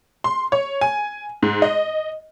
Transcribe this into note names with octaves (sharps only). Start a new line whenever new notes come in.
C6
C#5
G#5
G#2
D#5